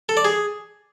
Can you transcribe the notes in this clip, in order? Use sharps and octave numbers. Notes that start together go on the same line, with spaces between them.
A4
D5
G#4